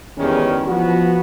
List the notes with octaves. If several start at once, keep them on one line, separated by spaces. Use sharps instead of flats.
E2 D#3 G3 G#3 C#4
F3 B3 F#4